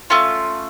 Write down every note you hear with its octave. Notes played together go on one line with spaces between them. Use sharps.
A3 C#4 F4